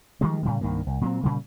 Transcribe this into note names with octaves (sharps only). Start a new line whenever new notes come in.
D#3 F3 G3 G#3
A2 C#3 G3
C2 G2 D#3 A#3
C2
A#2 F#3 C4
A#2 C#3 G3